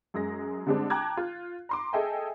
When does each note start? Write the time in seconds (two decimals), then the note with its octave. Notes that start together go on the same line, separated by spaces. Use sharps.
0.14 F#2 G#3 G#4 A#6
0.67 D3 G3 G#3 C4 D4
0.90 G5 A5 A#5 D6 F#6 G#6
1.17 F4
1.69 A#5 C6 D6
1.93 G#4 A4 D#5 E5 G5 G#5